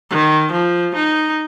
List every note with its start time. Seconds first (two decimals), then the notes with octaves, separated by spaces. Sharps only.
0.10 D#3
0.52 F3
0.95 D#4